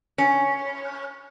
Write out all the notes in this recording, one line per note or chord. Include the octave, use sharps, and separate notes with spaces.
C#4